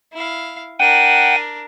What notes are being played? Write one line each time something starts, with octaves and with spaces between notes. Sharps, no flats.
E4 F5
D4 A#4 F#5 G5 D#7